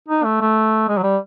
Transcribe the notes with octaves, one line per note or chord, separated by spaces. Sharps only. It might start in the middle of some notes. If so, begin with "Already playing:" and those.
D#4
A3
A3
G#3
F#3
G3